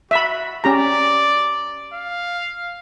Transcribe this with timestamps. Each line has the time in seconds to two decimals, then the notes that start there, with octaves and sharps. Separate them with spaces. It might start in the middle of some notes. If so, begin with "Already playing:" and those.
0.11 F#4 E5 B5
0.64 C#4 G4 D5 A#5
1.94 F5